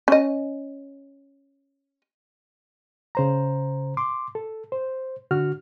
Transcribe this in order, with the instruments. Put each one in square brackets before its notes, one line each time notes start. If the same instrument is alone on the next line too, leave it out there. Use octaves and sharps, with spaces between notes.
[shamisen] C#4 D#5
[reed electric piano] C#3 C5 A#5
C6 D6
A4
C5
D3 F#4 F6